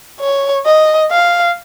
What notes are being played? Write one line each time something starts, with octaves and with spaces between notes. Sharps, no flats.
C#5
D#5
F5